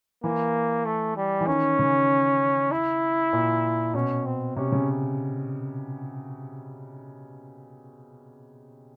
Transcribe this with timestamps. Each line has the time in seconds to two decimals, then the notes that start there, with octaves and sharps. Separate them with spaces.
0.24 E3 A#3
0.85 A3
1.17 G3
1.41 E3
1.47 D#3 C#4
1.79 C#3
2.72 E4
3.33 A#2
3.94 B2 C#4
4.26 C4
4.56 C3 C#4
4.72 C#3